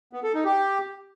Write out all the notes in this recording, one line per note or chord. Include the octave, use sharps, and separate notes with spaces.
B3
A4
D#4
G4